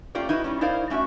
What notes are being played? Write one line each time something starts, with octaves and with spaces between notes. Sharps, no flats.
A3 A#3 C#4 F4 G4 D5
D#4 E4 F#4 B4
G3 C#4
D#4 E4 A#4 C5 D5 F5
A3 C#4 D4 F#4 E5